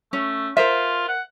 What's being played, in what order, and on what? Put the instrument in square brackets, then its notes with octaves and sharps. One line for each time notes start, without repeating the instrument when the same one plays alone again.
[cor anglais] A3 [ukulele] C#4
[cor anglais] F4 [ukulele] A#4 C5 E5
[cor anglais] F#5